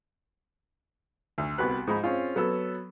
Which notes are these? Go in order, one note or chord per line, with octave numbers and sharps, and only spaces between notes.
D2
C2 B3 F#4 B4 F#6
G#2 F3 G#3 D#4 B5
C4 C#4 F4 G#4
F#3 B3 A4 E6